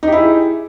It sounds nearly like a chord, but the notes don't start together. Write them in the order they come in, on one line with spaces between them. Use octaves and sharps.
D#4 G4 E4 G#4